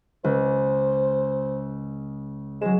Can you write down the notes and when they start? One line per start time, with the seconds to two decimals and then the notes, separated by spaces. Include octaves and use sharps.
0.24 C#2 C5
2.62 F#3 G#3 E7